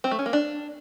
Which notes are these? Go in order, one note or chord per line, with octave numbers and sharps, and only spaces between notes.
C4
A3
C#4
A#3
D4